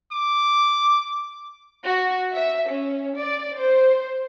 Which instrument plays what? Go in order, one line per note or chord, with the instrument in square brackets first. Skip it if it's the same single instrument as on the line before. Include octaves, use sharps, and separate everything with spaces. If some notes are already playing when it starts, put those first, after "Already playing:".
[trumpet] D6
[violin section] F#4
E5
C#4
D5
C5